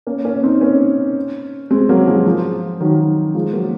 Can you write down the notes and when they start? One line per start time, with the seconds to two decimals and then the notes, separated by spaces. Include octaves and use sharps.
0.07 A#3 C#4
0.25 A#3 C#4
0.43 C4 D#4
0.61 A#3 C#4
1.71 G#3 C4
1.89 F#3 A#3
2.07 F3 G#3
2.26 F3
2.80 D#3 F#3
3.35 F3 G#3
3.53 F#3 A#3